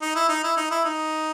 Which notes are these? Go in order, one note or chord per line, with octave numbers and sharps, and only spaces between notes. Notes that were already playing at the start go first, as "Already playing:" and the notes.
D#4
E4
D#4
E4
D#4
E4
D#4